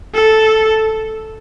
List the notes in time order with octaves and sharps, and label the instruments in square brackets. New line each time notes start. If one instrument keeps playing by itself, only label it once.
[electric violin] A4